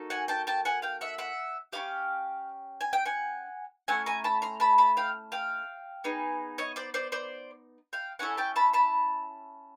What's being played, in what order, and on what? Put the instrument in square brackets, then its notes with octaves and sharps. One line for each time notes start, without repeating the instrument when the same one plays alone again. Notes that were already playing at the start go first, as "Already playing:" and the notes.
Already playing: [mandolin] A#3 D#4 F#4 A4
F#5 G#5
G5 A5
G5 A5
F#5 G#5
F5 G5
E5 F#5
E5 F#5
C#4 E4 G4 F5 G5
G#5
G5
F#5 G#5
A3 C#4 E4 F#5 G#5
G#5 A#5
A5 B5
A#5 C6
A5 B5
A5 B5
F5 G5
F5 G5
B3 D#4 G#4
C#5 D#5
C5 D5
C5 D5
C5 D5
F5 G5
C#4 E4 A4 F#5 G#5
G5 A5
A5 B5
A5 B5